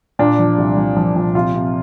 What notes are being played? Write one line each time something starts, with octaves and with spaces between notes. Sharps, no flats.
A#2 D4
F3
C2
F3
F3
A#2
C3 F4
C3